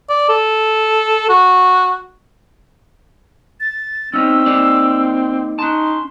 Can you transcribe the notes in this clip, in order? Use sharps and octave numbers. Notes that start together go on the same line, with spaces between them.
D5
A4
F#4
A6
C4 C#4 D#4 E6
A#3 D#4 D5
C#4 D#4 A5 C6